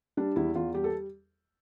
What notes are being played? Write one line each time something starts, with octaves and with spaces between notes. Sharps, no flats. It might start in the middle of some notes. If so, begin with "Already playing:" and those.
G3 D4
E2 E4
E2 F4
G3 G4
A4